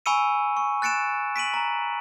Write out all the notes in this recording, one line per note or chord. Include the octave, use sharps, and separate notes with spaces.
G#5 B5 C#6 E6 C#7 D#7
C#6
F#6 A6 C#7 D7 E7
B6 D7 D#7 F#7
A#5